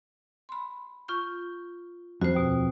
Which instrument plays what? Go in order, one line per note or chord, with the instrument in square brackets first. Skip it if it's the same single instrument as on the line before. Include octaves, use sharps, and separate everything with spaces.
[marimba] B5 C6
F4 C#6 G6
[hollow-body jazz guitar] F2 [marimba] F#4 C5
[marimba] D#2 B2